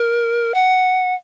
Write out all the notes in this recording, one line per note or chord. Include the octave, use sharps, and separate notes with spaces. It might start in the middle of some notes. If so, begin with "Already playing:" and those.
Already playing: A#4
F#5